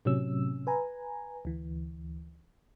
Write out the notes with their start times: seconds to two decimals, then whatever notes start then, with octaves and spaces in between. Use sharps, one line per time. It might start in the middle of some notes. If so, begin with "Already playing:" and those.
0.05 A2 C3 F#3 C#4 E6
0.67 B4 G#5 A#5
1.45 D2 E3